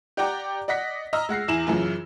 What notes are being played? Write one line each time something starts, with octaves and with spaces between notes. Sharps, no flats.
G4 D5 F#5 G5 A#5 D6
D5 D#5 F#5 A#6 B6
D#5 A#5 E6 F6
G#3 F#5 A#6 C7
E2 E4 E7 F#7
F#2 C#3 E3 F4